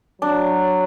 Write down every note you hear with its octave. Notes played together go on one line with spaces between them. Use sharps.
F#3 D4